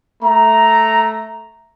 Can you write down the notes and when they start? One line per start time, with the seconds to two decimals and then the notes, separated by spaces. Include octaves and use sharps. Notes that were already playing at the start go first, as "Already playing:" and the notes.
0.24 A3 A#5